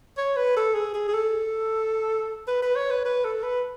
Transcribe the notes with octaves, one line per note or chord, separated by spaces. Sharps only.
C#5
B4
A4
G#4
G#4
G#4
A4
B4
B4
C#5
B4
B4
A4
B4